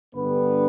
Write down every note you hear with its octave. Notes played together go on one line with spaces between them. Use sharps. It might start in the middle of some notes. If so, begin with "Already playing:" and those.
G2 D3 G3 B3 B4